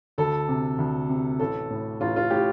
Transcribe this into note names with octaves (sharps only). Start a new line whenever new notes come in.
D2 A4
C3
D2
C3
A1 A4
A2
A1 F4
F4
A2 G4